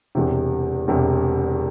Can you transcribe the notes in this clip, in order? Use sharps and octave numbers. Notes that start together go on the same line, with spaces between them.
E1 E2 C3
E1 E2 C3